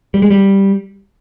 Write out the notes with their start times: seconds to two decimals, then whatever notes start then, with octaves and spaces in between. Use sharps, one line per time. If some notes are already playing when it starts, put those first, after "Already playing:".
0.14 G3
0.22 G#3
0.30 G3